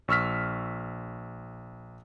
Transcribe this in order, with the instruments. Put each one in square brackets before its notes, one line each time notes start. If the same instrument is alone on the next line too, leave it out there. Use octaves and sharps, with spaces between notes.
[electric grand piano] A#1 C#6 E6 F6 B6